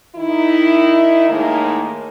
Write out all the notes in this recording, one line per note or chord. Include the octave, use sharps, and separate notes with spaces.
D#3 D#4 E4
A2 D#3 G#3 A#3